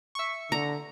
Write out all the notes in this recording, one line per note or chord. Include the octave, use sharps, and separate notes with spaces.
E5 C#6
D3 A#5